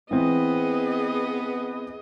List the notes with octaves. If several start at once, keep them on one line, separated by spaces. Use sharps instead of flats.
E3 B3 C4 G#4 D#5